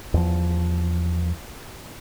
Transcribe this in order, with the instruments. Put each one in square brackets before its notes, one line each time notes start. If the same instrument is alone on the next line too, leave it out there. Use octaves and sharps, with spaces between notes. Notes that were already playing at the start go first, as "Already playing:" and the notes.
[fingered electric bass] E2 F3